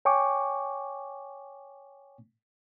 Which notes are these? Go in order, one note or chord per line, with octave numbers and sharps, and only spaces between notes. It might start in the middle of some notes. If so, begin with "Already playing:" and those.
C#5 G5 G#5 C#6 D6